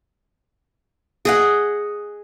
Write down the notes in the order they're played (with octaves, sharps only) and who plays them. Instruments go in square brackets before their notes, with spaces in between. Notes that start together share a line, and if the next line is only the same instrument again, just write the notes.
[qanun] G#4 D#5 F#5